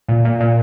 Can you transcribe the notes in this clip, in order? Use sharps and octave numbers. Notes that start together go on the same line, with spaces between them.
A#2
A#2
A#2